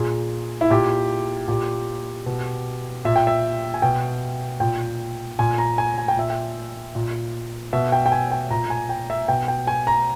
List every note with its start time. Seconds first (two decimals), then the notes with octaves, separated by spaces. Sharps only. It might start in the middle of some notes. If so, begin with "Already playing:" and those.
Already playing: A#2 G#4
0.61 E4
0.70 A#2 G4
1.48 A#2 G4
2.26 B2
3.05 A#2 E5
3.16 G5
3.27 E5
3.74 G#5
3.82 B2 G5
4.60 A#2 G5
5.39 A#2 G#5
5.58 A#5
5.78 G#5
5.98 G#5
6.08 G5
6.16 A#2 E5
6.30 G5
6.95 A#2
7.73 B2 E5
7.92 G5
8.06 G5
8.12 G#5
8.31 G5
8.50 A#2 A#5
8.70 G#5
8.89 G5
9.10 E5
9.28 B2 G5
9.48 G5
9.67 G#5
9.87 A#5